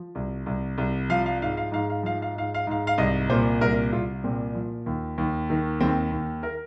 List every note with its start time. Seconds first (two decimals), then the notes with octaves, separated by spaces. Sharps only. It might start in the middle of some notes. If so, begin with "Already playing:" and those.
Already playing: F3
0.15 C2
0.46 C2
0.78 C2
1.09 F3 F5
1.26 F5
1.41 G#2 F5
1.57 F5
1.72 G#2 F5
1.90 F5
2.03 F3 F5
2.22 F5
2.35 G#2 F5
2.54 F5
2.67 G#2 F5
2.87 F5
2.98 C2 D#5
3.30 A#2 C5
3.61 C2 A#4
3.92 C2 F4
4.24 A#2 C4
4.55 F3
4.86 D#2
5.18 D#2
5.50 D#3
5.80 D#2 C4
6.12 D#2
6.43 A#4